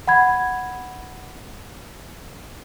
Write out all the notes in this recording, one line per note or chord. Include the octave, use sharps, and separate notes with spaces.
F#5 B5 G#6